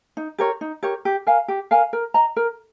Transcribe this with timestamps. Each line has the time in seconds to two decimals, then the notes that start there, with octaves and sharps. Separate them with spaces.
0.17 D#4
0.38 G4 A#4 C#5
0.61 D#4
0.83 G4 A#4 C#5
1.05 G4
1.27 A#4 F5 G#5
1.48 G4
1.71 A#4 F5 G#5
1.93 A#4
2.14 D#5 A#5
2.36 A#4